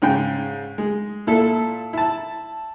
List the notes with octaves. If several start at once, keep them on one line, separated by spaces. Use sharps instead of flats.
G#2 C#3 G5
G#3
A#2 E4 A4
E4 A5